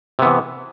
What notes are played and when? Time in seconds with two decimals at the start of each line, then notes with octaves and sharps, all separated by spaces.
0.19 C3
0.22 B3
0.25 E3